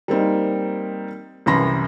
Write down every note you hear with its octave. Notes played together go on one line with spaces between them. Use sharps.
G3 A#3 C4 D#4
C2 F#2 E3 B5 C6 A#6